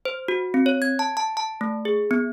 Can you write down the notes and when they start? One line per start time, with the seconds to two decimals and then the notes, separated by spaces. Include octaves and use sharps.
0.05 C5
0.28 F#4
0.54 C4
0.66 C#5
0.82 G#6
0.99 A5
1.17 A5
1.37 A5
1.61 A3
1.85 G#4
2.11 B3